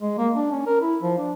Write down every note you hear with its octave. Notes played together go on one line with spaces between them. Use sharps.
G#3
A#3
D4
C#4
A#4
E4
F3
D4